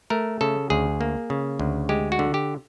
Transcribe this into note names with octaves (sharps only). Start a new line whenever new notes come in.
A3 A#4
C#3 A4
D2 G#4
A#3
C#3
D2
G#3 G4
F#4
D3
G4